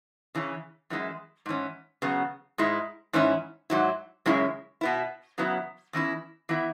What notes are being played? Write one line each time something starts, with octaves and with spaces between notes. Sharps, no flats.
C#3 E3 C#4
F#2 E3 G#3 E4
G#2 E3 C#4
C#3 F#3 B3
G#2 G#3 E4
G#2 E3 C#4 E4
G#2 F#3 E4
F#2 C#3 G#3 C#4 E4
B2 B3 E4
C#3 F#3 B3 E4
E2 E3 C#4 E4
E3 B3 E4